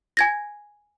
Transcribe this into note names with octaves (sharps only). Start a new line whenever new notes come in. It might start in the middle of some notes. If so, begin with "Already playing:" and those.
G#5 G#6 A#6